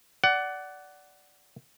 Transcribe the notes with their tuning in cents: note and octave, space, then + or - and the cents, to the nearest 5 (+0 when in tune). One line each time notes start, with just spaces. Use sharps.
D5 -10 F#5 +20